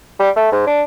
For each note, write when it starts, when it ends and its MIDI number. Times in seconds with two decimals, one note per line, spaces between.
0.20 0.30 55
0.36 0.49 57
0.52 0.67 44
0.67 0.82 62